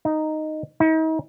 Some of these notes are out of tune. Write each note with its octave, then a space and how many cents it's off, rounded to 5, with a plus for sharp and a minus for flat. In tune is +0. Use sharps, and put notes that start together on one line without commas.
D#4 -5
D#4 +40